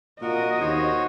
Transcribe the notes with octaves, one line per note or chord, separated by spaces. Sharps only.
A#2 F#4 A#4 D#5
D#2 F#4 C5 C#5